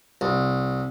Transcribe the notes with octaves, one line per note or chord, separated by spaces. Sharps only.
C2